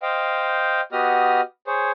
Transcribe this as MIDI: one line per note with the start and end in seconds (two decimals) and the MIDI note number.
0.02 0.81 72
0.02 0.81 75
0.02 0.81 77
0.02 0.81 79
0.92 1.41 59
0.92 1.41 66
0.92 1.41 67
0.92 1.41 75
0.92 1.41 87
0.92 1.41 89
1.67 1.92 68
1.67 1.92 72
1.67 1.92 73